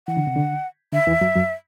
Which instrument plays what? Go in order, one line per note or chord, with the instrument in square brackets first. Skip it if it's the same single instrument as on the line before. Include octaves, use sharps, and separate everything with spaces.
[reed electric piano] E3 [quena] F#5
[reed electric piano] D3
C3
D3
[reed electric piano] D3 [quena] E5
[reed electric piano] E2 E3
F#2 F#3
F#2 F#3